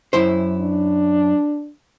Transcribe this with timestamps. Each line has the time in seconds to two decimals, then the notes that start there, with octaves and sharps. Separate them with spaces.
0.13 F#2 E4 C5
0.61 D4